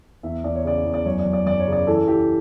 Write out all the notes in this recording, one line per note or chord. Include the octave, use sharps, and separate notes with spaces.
E2 E5
E2 D5
C#5
C#3 D5
E2
D5
F#2 C#5
D5
F#2
D5
F#2 D5
C#5
C#3 D5
E3 A4
E3 G4